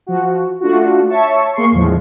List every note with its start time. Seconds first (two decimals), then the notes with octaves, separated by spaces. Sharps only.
0.06 F3 F#4
0.61 A3 D4 F4 F#4
1.10 C#5 E5 A5 C#6
1.55 A#3 G#4 C6 C#6 C7
1.72 E2 A2 D3 F3 G#3